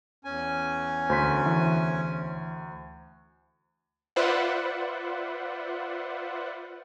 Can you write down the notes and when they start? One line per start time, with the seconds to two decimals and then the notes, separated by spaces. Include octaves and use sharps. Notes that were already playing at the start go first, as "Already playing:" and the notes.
0.25 E2 C#4 G#5
1.10 D2 C5 C6 B6
1.46 E3
4.16 F4 B4 C5 D5 E5 F#5